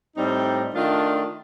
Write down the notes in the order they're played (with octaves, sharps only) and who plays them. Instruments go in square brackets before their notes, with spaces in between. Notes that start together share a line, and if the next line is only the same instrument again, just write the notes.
[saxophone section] A2 G3 C4 D#4
D#3 A3 D4 F4